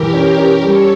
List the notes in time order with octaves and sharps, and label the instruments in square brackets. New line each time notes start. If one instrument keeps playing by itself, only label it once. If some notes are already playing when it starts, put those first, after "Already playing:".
Already playing: [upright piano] E3 [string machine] G4 A#4
[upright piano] C#4
C#4
[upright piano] G3 [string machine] A4 C#5